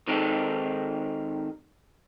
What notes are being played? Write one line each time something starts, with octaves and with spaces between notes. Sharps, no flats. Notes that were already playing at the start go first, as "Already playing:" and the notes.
D#3 G#3 C4 D#4 G4 A4